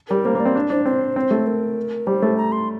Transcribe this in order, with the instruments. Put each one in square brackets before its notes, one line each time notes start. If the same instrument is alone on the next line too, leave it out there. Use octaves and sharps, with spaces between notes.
[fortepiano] G3 [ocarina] A#4
[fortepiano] A#3 [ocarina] C5
[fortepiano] A#3
[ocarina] D5
[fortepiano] C4
D4
[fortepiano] D4 [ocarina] C5
[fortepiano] C4 [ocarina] C5
[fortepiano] C4
A3
[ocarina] A#4
[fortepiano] G3 [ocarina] C5
[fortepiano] A3
[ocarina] A#5
C6